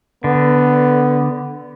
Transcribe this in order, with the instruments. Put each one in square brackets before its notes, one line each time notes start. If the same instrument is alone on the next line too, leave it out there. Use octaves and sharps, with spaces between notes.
[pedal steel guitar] D3 [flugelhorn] B3